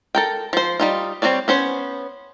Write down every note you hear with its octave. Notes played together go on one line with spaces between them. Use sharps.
A4 A#4 G5
F3 C5
G3 D#4 F4
G3 C4 F#4 C#5 D5
B3 C#4 C5